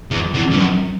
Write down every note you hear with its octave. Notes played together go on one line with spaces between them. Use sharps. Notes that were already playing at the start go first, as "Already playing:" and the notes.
E2
E2
G2
F#2